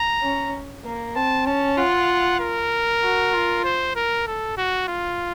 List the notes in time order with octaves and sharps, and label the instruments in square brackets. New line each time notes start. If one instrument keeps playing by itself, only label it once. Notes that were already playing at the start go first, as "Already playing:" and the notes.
Already playing: [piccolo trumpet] A#5
[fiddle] C#4
A#3
[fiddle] C4 [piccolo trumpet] A5
[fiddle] C#4 [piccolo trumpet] A5
[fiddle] F4 [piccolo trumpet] F#5
[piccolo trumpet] A#4
[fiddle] F#4
F4
[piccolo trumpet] C5
A#4
A4
F#4
F4